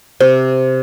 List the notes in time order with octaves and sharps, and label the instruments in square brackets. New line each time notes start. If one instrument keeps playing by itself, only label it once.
[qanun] C3 [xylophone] C5